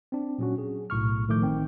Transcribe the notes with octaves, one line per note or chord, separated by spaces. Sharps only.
C4 D4
A#2 F#3 C#4 F#4
G#4
B1 A2 C#6 F6
A2 D#3 F3 A3 D6 G6
A1 D#3 C4 G5